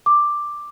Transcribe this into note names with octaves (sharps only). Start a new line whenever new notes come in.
D6